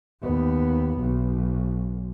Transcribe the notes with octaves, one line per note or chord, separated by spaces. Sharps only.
D#2 B3
B1